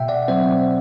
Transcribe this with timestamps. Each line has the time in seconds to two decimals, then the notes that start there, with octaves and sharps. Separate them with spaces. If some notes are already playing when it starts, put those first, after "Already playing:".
Already playing: B2 E5 G5
0.08 D5 F#5
0.28 F#3 C4 C5 E5